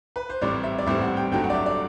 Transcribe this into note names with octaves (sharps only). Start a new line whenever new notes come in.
B4
C5
A1 A2 G3 C4 D5
E5
D5
A1 A2 G3 C4 E5
F#5
G5
G1 G2 F#3 A3 G5
F#5
D5
E5
D5